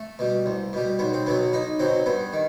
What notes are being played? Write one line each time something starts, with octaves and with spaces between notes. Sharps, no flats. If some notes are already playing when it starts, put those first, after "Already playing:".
Already playing: A3
B2 G3
C2
B2 G3
B1 B3
C4
B2 F#3 B3
B1 D#4
B2 F#3 C4
G2 B3
D#3